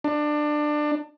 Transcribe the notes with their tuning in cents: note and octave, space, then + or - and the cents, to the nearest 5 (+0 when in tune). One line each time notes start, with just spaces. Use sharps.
D4 +20